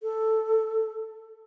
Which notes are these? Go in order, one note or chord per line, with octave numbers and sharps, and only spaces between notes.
A4